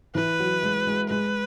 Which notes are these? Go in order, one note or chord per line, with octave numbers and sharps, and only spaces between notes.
E3 B4
F#3
G#3
G#3
G#3 B4